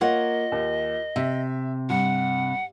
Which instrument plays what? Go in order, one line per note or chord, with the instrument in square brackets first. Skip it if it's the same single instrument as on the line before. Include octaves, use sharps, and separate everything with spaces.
[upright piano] A#3 [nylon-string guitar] F4 C#5 F#5 [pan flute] D#5
[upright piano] D#2
[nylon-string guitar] C3 [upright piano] E5
[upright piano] G2 [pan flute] F#5